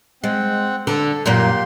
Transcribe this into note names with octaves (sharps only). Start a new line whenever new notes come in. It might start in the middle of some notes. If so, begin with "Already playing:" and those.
G#3 C4 F#5
D3 A4
F#2 A#2 A#3 G4 C6